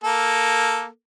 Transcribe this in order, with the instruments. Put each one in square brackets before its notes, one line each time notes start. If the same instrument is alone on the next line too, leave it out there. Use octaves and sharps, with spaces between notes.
[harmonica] A#3 A4